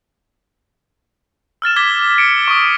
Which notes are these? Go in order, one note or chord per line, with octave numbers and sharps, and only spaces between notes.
E6 F6 A6 E7
D6 G#6 B6 G7
C#7 D7
C#6 D#6